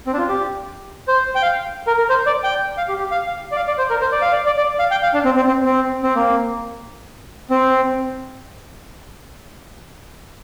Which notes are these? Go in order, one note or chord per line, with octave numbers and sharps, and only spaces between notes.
C4
D4
F4
G4
C5
G5
F5
A#4
A#4
C5
D5
G5
F5
G4
G4
F5
F5
D5
F5
D5
C5
A#4
C5
D5
F5
D5
D5
D5
F5
G5
F5
D4
C4
C4
C4
C4
C4
A#3
C4